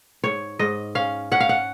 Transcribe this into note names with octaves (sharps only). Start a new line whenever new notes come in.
G#2 C#5
G#2 D#5
C#4 F5
C#4 F#5
F5
F#5